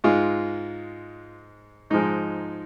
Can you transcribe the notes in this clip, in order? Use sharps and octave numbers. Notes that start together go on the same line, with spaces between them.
G#2 G#3 F4
G#2 F3 G#3 D#4